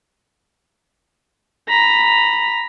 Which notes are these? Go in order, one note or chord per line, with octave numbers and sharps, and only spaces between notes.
A#5 B5